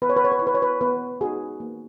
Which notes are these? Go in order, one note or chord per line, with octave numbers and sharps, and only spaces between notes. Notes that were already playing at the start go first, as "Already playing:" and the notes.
B3 B4
C#5
B4
C#5
B4
C#5
E4
B4
C#5
B4
B3 B4
D#4 F#4 G#4
A#3